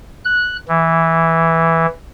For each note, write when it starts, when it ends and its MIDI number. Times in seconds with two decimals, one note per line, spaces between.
0.25 0.57 90
0.68 1.86 52